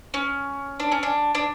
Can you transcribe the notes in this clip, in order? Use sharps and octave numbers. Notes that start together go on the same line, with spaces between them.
C#4
D4
C#4
D4
D4